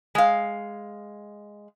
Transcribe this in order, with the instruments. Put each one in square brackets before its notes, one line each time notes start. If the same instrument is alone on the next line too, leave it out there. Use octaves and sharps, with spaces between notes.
[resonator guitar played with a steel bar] G#3 F5